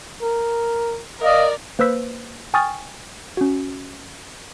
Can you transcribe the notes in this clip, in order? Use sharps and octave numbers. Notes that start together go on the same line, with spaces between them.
A#4
A#4 D5 D#5 F5
A#3 B4 C5 E6 B6
G5 G#5 C#6 D#6 F6 A6
C#4 F#4